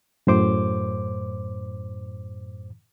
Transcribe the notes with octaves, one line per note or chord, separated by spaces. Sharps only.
F#2 A2 C5 D6